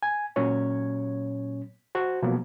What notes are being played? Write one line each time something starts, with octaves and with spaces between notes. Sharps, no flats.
G#5
A#2 F#3 C#4 C#5
F#4 C5
B2 F3 F#3 A#3